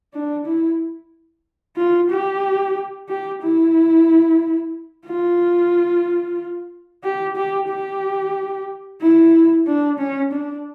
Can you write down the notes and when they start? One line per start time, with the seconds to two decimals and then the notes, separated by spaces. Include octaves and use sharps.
0.14 D4
0.46 E4
1.77 F4
2.10 G4
3.09 G4
3.42 E4
5.06 F4
7.04 G4
7.36 G4
7.69 G4
9.01 E4
9.67 D4
9.99 C#4
10.32 D4